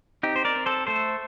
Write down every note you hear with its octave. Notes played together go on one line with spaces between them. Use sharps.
C4 D#4 G4
C5
A#4 D5
C4
A4 C5
A3 A4 C5